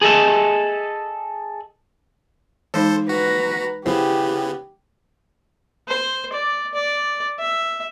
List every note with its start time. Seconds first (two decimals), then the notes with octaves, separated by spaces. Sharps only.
0.01 G#4 A4 D#5 E5
2.74 E3 G#3 D#4 A4 C5
3.09 F#4 B4 A#5
3.86 C#3 B3 E4 G4 C5
5.88 C5
6.33 D5
6.74 D5
7.39 E5